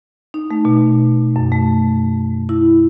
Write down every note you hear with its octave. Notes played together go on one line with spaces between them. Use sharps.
D#4
A3
B2
F#2
A3
E4